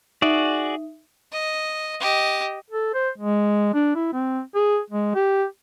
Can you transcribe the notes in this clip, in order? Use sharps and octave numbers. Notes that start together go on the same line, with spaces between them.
D#4 F#4 G#4 D5 E5 D#6
D#5
G4 D#5
A4
C5
G#3
D4
E4
C4
G#4
G#3
G4